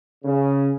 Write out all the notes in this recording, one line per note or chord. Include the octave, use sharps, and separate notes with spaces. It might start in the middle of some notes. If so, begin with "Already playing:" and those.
C#3